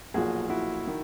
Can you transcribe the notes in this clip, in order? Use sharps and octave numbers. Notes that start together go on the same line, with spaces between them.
B1 A#2 F3 F#4 G#4
E4 F#4
D#3